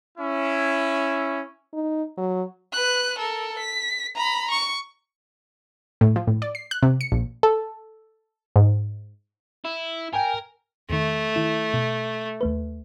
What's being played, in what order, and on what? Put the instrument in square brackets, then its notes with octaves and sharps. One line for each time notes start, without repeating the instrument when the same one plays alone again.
[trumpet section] C#4 E4
[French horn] D#4
F#3
[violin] B4 F#6
A4 A#4
B6
A#5 B5
C#6
[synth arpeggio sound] A2
F3
A2
D5
C7
F#6
C3
C#7
A#1
[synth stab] A4
G#2
[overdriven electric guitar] E4
[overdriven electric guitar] A#4 [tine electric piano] G5 G#5
[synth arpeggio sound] E2 D#3 [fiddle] A3
[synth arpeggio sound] D#3 E4 E7
B2
D#2 A3 B4